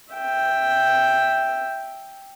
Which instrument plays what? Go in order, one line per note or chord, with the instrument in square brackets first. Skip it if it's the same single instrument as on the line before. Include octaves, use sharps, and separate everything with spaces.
[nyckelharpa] E5 G5